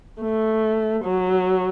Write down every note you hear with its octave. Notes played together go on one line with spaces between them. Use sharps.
A3
F#3